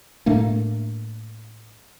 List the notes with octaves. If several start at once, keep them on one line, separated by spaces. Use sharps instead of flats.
A2 A3 A#3 D4